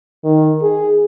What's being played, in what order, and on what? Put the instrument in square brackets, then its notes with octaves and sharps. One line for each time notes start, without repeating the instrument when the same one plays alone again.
[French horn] D#3
G#4